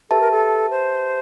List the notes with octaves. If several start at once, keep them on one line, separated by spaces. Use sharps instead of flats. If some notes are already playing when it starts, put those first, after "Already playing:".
G4 A4 B4 E5 A5
A#4
A4
C5